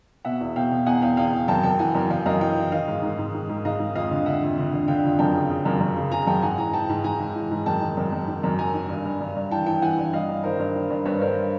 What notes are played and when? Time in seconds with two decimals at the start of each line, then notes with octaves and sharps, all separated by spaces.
0.25 B2 E5 F#5
0.41 E2
0.56 B2 F5 G5
0.71 B2
0.86 E2 F#5 G#5
1.02 E2 F5 G5
1.17 E2 F5 G5
1.33 E2
1.48 F#2 G5 A5
1.63 F#2 G5 A5
1.79 E3 F#5 G#5
1.95 F#2
2.10 F#2 F5 G5
2.26 F#2 D#5 F5
2.41 E3 F5 G5
2.56 E3
2.72 D#3 D#5 F5
2.87 G#2
3.03 G#2
3.18 G#2
3.34 D#3
3.49 G#2
3.65 G#2 D#5 F5
3.79 G#2
3.95 F2 D#5 F5
4.11 D3
4.26 D3 E5 F#5
4.42 F2
4.58 D3
4.73 D3
4.88 D3 F5 G5
5.03 F2
5.19 F#2 G5 A5
5.34 C#3
5.50 C#3
5.65 F#2
5.80 F#2
5.96 C#3
6.11 C#3 G#5 A#5
6.27 F#2 G5 A5
6.42 G#2 F#5 G#5
6.58 E3 G#5 A#5
6.73 E3 G5 A5
6.89 G#2
7.04 G#2 G#5 A#5
7.20 G#2
7.35 E3
7.51 G#2
7.66 F#2 G5 A5
7.82 D#3
7.97 F#2
8.12 F#2
8.28 D#3
8.43 F#2
8.59 D#3 G#5 A#5
8.74 D#3
8.89 G2
9.05 G2
9.20 G2
9.36 G2
9.51 E3 G5 A5
9.66 E3 G5 A5
9.82 E3 F#5 G#5
9.98 G2
10.13 G2 D#5 F5
10.29 G2
10.44 D#3 A#4 C5
10.59 G2
10.75 D#3
10.90 G2
11.05 G2 B4 C#5
11.21 G2 A#4 C5